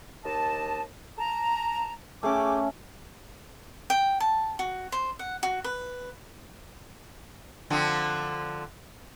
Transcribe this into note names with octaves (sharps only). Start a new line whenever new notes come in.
D#2 D#5 A5
A5 A#5
A3 C#4 G#4 G5 D6
G5
A5
F#4
C5
F#5
F#4
B4
D3 F3 C4